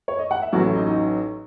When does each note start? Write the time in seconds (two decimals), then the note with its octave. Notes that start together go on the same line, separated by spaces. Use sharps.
0.08 C#5
0.19 D#5
0.31 F#5
0.42 E5
0.52 A1 A2 F#3 F#4
0.65 E4
0.76 D#4
0.87 D#4